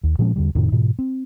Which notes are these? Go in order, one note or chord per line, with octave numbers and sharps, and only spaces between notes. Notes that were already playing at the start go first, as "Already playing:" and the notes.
D#2
A#2 F3 G#3 C#4
E2 D3 G3
F2 A2 C3 D#3
G#2 B2 E3
C4